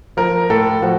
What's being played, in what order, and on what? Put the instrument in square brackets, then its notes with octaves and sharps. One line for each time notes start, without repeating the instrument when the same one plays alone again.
[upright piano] F3 A#4
A2 A4
F3 F#4